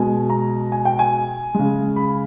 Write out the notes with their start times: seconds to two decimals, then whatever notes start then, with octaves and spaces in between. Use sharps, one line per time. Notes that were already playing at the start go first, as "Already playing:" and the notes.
Already playing: B2 G#3 G#5
0.30 A#5
0.72 G#5
0.85 G5
0.99 G#5
1.55 C#3 G#3
1.96 B5